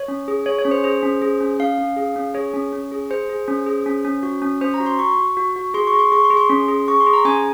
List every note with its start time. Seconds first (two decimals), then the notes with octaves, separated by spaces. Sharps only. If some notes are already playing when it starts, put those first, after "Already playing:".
Already playing: C#5
0.08 C#4
0.28 G#4
0.46 G#4 C#5
0.59 C#5
0.65 C#4
0.71 C5
0.84 G#4 C5
1.03 C#4
1.22 G#4
1.40 C#4
1.59 C#4 F5
1.78 C#4
1.96 G#4
2.16 C#4
2.34 G#4 C#5
2.54 C#4
2.73 C#4
2.92 G#4
3.10 G#4 C5
3.30 G#4
3.48 C#4
3.66 G#4
3.86 C#4
4.05 C#4
4.23 F#4
4.42 C#4
4.61 C#4 C5
4.74 A#5
4.80 F#4
4.86 C6
4.99 F#4 C#6
5.18 F#4
5.37 F#4
5.56 F#4
5.74 G#4 C6
5.87 C#6
5.93 G#4
5.99 C6
6.12 G#4 C#6
6.24 C6
6.30 G#4
6.37 C6
6.50 C#4
6.68 G#4
6.88 G#4 C#6
7.00 C6
7.06 G#4
7.13 A#5
7.25 C#4 G#5